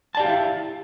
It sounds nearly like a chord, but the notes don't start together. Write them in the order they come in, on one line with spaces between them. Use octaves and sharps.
A5 D5 G4 F5 E4